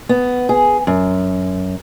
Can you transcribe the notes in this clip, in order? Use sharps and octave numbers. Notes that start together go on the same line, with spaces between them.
B3
G#4
F#2